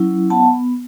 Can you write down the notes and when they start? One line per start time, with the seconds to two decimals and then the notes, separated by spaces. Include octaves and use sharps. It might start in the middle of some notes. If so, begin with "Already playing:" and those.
Already playing: F#3 C#4 E4
0.30 B3 F#5 A5